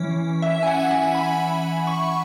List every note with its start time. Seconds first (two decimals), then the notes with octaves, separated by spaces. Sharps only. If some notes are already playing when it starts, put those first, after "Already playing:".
Already playing: E3 C#4
0.42 E5
0.63 G#5
0.67 F#5
0.91 G#5
1.15 B5
1.87 C#6